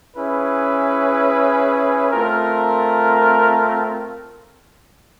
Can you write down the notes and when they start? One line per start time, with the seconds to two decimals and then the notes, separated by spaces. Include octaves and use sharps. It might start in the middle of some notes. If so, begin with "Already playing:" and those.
0.17 C#4 E4 G#4 B4
2.11 A3 C4 F4 A#4